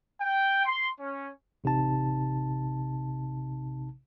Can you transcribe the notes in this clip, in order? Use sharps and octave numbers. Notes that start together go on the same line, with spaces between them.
G5
C6
C#4
A1 C3 D#4 A5